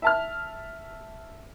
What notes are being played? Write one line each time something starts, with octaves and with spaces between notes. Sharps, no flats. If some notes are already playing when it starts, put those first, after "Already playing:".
E5 A5 F6